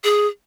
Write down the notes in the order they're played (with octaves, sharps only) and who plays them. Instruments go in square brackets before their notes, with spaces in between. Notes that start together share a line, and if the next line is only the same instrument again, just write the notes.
[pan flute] G#4